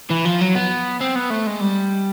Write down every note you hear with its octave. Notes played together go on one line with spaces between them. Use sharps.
E3
F3
F#3
B3
C4
B3
A3
G#3
G3